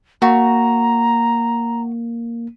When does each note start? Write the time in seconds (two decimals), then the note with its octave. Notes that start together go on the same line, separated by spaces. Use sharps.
0.22 A#3 F#4 A#5